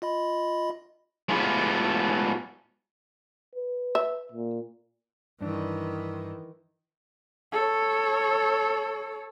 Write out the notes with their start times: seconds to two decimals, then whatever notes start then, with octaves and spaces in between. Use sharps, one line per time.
0.02 F4 D#5 B5
1.29 G#3 A3 B3 E4 F4 G4
3.55 B4
3.95 E5
4.31 A#2
5.41 G2 D#3 E3 D4
7.52 A4 C#5